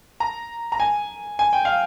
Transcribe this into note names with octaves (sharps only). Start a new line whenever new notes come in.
A#5
A#5
G#5
G#5
G5
F5